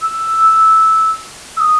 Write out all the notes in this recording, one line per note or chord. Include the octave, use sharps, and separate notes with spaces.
E6
E6
D#6